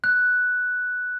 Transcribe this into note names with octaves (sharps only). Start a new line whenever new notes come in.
F#6